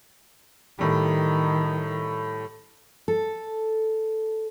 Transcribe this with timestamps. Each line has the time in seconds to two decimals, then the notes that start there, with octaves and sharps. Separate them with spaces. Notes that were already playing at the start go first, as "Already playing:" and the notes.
0.79 A2 D#3 G3
3.08 A4